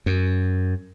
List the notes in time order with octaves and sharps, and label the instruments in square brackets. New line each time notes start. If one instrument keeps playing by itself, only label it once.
[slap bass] F#2